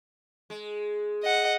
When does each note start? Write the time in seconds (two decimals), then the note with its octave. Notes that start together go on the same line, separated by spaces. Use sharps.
0.50 G#3
1.23 D#5 F#5